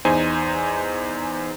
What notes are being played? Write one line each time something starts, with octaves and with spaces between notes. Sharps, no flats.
E2 D#4 C5 G#5